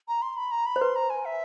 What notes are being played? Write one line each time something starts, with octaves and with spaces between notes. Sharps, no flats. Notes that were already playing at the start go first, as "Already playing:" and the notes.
A#5
C6
B5
A#5
B5
C5
B4 C6
A#5
G#5
E5